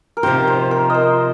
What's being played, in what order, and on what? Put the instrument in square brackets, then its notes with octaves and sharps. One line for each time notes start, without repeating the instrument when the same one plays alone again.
[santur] A#4
[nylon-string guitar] C3 F3 D#4 G4 [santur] C5
[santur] C5
A#4
C5 D#5